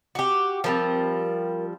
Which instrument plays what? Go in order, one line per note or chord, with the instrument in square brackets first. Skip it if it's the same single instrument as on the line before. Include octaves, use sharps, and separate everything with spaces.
[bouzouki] F#4 G4
[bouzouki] F3 G3 C4 [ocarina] A#4